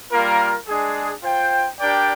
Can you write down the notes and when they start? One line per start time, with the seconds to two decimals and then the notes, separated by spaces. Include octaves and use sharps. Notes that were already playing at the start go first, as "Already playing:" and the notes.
0.11 G3 A#3 F4 A#4
0.68 G#3 D4 G#4
1.23 F4 C5 G5
1.80 D4 G4 A#4 D5 G5